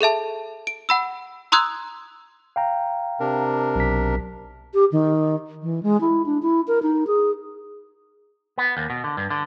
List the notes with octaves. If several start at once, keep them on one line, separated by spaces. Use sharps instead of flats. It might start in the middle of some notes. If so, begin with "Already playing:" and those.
G#4 A4 E5 A5
D7
F#5 B5 E6
A#5 C6 D#6 E6 F#6 G#6
F5 G5 A#5
C3 D4 A#4
B1 B6
G4
D#3
E3
G#3
E4
D4
E4
A#4
D#4
G#4
B3
D#2
B2
D3
G2
D3